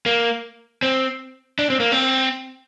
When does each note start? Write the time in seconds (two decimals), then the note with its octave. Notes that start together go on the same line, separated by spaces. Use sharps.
0.06 A#3
0.82 C4
1.59 D4
1.70 C4
1.80 A#3
1.92 C4